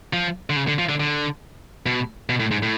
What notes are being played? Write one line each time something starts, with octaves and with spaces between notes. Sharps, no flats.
F3
D3
C#3
D3
F3
D3
D3
B2
B2
A2
G#2
A2